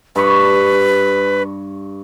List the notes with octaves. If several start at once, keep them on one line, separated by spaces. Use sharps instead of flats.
G2 B4 C#6